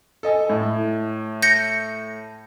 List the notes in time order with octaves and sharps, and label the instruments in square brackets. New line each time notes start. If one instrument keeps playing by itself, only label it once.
[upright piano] A4 D#5 G#5
A2
[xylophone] G6 A#6 C#7